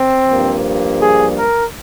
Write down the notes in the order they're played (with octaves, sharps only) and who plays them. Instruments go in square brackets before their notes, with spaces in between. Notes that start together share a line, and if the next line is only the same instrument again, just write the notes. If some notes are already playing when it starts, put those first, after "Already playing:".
Already playing: [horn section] C4
G2 F3 A#3
G#4
A#4